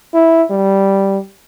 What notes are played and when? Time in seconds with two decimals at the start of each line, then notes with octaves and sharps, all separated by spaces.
0.14 E4
0.50 G3